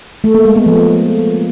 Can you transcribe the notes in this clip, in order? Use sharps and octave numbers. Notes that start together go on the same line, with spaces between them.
A3
A#3
G#3
B3
F3